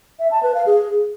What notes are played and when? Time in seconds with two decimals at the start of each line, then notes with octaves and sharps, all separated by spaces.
0.19 E5
0.31 A5
0.43 B4
0.55 F5
0.66 G#4